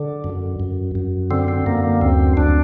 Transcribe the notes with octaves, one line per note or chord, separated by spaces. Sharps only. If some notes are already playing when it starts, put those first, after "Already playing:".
Already playing: D3
F#2
F#2
F#2
D3 C4
C4
F#2 A#3
A#3
D2 C4
D2 D4